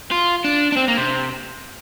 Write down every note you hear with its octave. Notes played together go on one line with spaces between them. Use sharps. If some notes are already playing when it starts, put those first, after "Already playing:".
F4
D4
D4
C4
A#3
C3